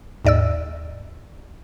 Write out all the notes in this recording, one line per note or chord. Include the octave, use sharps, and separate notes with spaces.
D#2 G#2 D5 D#5 E6